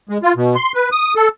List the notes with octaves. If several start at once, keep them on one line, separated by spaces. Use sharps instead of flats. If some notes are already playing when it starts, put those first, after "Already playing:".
G#3
F4
B2
C6
B4
D#6
A4